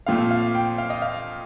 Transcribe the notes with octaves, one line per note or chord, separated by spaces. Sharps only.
A#2 F3 A3 C4 F5
F5
G5
F5
D#5
F5